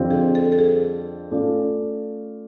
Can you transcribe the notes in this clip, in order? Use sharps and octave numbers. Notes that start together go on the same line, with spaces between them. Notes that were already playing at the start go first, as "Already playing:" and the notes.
Already playing: F2 D3 G3 C4 F4
G#4
A4
A4
G#4
A3 C#4 F4 A4 D5